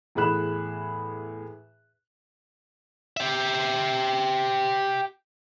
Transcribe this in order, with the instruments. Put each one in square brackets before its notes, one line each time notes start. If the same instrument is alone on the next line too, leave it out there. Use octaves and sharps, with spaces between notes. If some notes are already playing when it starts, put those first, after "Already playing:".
[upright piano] E2 A2 G#4 B5 F#6 E7
[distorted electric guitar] G4 E5